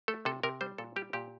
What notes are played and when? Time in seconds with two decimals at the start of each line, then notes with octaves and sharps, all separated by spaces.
0.08 A3 A4
0.25 C3 A4
0.43 C3 A#4
0.61 G3 C5
0.78 A#2 A4
0.96 G3 G4
1.13 A#2 G4